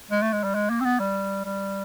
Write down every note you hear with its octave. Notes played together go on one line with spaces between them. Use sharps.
G#3
A3
G#3
G3
G#3
A#3
C4
B3
G3
G3